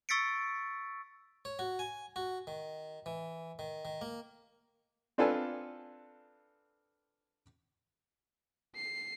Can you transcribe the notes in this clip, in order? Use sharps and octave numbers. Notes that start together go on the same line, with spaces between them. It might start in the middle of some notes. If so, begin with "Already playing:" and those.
C#6 E6 A6 B6 C#7 D7
C#5
F#4
G#5
F#4
D#3
E3
D#3
D#3
A#3
C4 D4 F4 A4 B4 G#5
C7